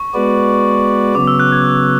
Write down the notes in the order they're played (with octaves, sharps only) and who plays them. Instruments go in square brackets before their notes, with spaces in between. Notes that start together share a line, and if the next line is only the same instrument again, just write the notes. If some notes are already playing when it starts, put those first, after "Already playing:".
Already playing: [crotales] C#6
[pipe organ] G#3 B3 F#4 B4 D5
[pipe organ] C#3 F#3 B3 [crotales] D6
[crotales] E6
F#6
G#6